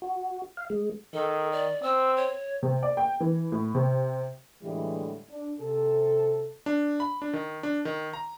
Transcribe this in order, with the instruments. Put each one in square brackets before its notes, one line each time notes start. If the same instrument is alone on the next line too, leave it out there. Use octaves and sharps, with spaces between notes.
[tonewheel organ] F#4
F5
G#3
[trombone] D#3 [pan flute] A4
[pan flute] D5
[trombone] C4 [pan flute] E6
[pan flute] C#5
[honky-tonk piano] C3
D5
G5
E3
A2
C3
[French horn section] A2 D3 E3 G3 G#3
D4
C3 A4
[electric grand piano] D4
B5
D4
D#3
D4
D#3
A#5